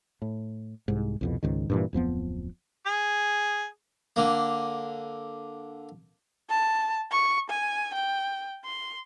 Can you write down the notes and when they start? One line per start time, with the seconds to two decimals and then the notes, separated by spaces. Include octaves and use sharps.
0.22 A2
0.88 C2 G#2
1.21 C2 F2 B2
1.43 C#2 G#2 D#3
1.70 G2 A#2 E3
1.93 D1 F2 F3 B3
2.86 G#4
4.16 D3 A#3
6.50 A5
7.12 C#6
7.50 G#5
7.94 G5
8.65 C6